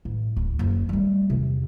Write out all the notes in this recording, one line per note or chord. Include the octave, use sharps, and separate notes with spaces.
A1
D1
F#1
G3 A3
E2 C3